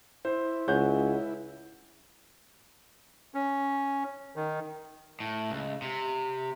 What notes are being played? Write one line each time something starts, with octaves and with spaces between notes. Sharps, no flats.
E4 C5
C#2 G#4 C#5 F#5 G#5 G6
C#4
D#3
A2
C#2
C3